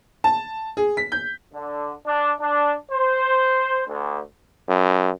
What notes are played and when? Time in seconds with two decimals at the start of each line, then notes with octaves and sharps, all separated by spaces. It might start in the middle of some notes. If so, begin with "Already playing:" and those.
0.24 A5
0.77 G#4
0.97 B6
1.12 G6
1.54 D3
2.07 D4
2.40 D4
2.91 C5
3.87 D2
4.69 F#2